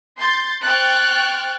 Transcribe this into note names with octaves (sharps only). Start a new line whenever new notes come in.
C6 G6 A6
C5 G5 C#6 F6 F#6 A6